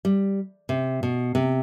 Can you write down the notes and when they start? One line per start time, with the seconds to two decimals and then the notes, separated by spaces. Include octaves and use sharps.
0.05 G3
0.69 C3
1.03 B2
1.35 C3